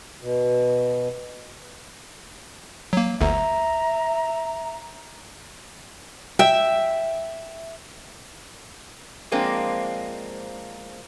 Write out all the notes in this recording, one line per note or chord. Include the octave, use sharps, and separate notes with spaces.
B2
F#3 A#3
G1 D2 D3 E5 A#5
E5 G5
F3 G#3 A#3 C4 D4